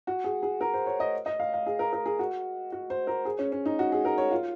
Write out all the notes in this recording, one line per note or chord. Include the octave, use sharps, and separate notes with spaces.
F#4
G#4
G#4
A#4
C5
C#5
D#5
D#5
F5
F5
G#4
A#4
A#4
G#4
F#4
F#4
C5
A#4
G#4
C#4
C#4
D#4
F#4
G#4
A#4
C#5
F4